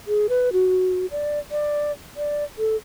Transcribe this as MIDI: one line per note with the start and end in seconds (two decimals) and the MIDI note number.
0.07 0.27 68
0.29 0.49 71
0.53 1.06 66
1.11 1.39 74
1.51 1.92 74
2.17 2.44 74
2.58 2.76 69